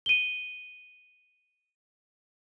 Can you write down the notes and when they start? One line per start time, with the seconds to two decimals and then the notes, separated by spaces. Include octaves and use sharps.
0.06 D#7 G7